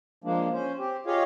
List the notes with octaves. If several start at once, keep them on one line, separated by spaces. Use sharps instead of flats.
F3 G#3 A#3 D4
C#4 C5
C4 G4
F4 G4 G#4 C#5 D#5 F5